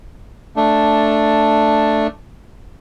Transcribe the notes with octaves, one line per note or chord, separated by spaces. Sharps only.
A3 D4